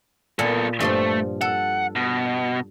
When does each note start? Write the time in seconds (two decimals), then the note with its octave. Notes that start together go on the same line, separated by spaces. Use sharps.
0.39 A#2 B3 A4
0.80 G2 F3 A3 C6
1.41 A4 F#5
1.96 B2